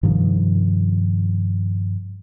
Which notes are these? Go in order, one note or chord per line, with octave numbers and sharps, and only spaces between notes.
G2 C3 D#3 F3